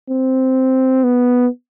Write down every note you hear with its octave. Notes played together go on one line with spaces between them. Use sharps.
C4
B3